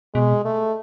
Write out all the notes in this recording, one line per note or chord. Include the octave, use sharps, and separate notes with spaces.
B2 G#3
A3